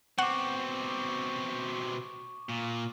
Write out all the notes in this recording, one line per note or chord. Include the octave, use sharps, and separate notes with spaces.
B2 C4 F#5 C#6 D6
A#2